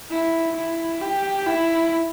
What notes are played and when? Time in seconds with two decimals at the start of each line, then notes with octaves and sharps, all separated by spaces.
0.11 E4
0.56 E4
1.01 G4
1.47 E4